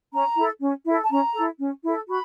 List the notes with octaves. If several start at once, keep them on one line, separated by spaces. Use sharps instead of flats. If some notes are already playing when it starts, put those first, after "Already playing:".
C#4 A#5
E4 A4
C#4
E4 A4
A5
C#4 A#5
E4 A4
C#4
E4 A4
F#4 B5